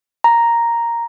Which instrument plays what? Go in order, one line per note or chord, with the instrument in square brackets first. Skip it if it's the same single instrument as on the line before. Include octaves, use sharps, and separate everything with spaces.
[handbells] A#5